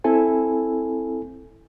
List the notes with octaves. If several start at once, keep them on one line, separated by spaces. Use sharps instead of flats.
C4 E4 A4 G#5